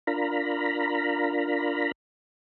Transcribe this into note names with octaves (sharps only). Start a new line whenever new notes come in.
D4 F4 A#4 A#5 B5